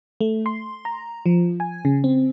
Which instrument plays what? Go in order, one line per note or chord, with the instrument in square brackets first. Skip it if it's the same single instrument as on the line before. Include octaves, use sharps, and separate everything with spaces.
[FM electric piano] A3
C6
A#5
F3
G#5
C#3
C4